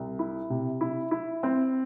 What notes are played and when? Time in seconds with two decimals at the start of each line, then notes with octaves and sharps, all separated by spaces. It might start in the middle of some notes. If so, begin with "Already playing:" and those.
Already playing: C2
0.19 E4
0.50 C3
0.81 E4
1.11 E4
1.43 C4